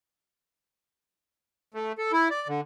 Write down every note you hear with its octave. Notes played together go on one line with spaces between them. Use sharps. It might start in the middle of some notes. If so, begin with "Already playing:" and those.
A3
A4
E4
D5
D3